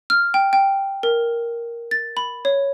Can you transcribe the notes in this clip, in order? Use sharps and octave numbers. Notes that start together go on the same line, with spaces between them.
F6
G5
G5
A#4
A6
B5
C#5